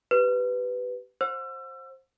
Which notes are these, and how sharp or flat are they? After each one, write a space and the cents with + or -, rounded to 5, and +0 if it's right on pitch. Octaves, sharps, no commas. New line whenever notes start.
G4 -15 B4 +10
C5 +15 F#5 -40 E6 +30